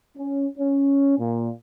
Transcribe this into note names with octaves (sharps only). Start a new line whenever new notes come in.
C#4
C#4
A#2